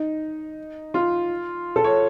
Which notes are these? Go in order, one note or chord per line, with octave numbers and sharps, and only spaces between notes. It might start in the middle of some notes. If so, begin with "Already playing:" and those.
Already playing: D#4
F4
A4
C#5